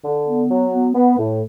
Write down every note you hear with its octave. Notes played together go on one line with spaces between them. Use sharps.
D3
B3
F#3
B3
B3
A2